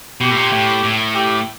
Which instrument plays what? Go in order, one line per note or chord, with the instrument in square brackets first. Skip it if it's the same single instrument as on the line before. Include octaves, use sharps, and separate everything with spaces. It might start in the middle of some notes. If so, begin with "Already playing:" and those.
[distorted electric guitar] B2 [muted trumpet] G4
[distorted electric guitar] A2
A#2
A2
A2
[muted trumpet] G4